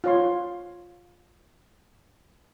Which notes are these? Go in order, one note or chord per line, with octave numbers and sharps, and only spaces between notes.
F4 C#5 C6